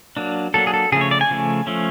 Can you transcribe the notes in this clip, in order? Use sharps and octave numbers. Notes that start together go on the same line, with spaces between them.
F#3 A#3 D4
F#3 A#3 D4 A4
G#4
A4
C#3 F3 A3 G#4
C#5
D5
G#5
C#3 F3 A3
F3 A3 C#4